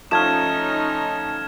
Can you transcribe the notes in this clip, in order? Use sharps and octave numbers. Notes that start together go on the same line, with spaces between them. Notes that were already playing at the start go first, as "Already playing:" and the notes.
F3 A3 C#4 D#4 F6 G#6 E7